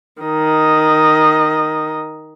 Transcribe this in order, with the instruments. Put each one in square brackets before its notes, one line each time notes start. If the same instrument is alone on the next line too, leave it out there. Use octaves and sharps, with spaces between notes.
[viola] D#3 D#5